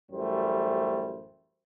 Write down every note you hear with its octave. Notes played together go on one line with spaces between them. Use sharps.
A1 F#2 G3 A3 C5